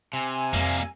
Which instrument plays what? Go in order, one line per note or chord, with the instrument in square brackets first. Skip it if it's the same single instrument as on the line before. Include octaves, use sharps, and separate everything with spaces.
[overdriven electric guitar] C3 [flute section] G#5 E6
[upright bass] F2 C4 [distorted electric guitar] G3 A#3